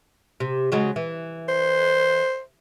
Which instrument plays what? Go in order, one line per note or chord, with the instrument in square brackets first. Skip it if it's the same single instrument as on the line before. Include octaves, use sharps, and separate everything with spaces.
[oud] C3
C#3 F#3 G#3
E3
[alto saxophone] C5